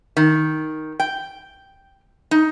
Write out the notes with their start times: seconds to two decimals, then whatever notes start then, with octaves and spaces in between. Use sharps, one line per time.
0.17 D#3
1.00 G5
2.31 D#4